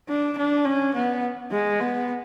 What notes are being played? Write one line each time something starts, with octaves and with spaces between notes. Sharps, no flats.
D4
D4
C#4
B3
G#3
B3